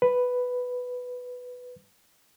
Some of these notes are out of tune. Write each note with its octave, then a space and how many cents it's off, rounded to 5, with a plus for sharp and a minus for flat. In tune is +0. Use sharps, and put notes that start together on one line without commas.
B4 +5